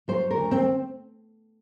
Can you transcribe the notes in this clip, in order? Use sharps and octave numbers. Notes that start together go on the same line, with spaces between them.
F#3 C5
A#4
D2
C4